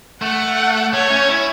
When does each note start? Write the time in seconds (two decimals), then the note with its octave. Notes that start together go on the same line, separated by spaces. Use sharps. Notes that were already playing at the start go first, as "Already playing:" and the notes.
0.22 A3 F#5
0.93 A3 C#5
1.10 C#4
1.29 E4